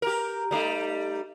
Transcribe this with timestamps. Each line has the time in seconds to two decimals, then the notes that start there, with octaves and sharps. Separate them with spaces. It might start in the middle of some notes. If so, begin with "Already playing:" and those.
0.02 G4 A#4
0.51 G3 A3 D#4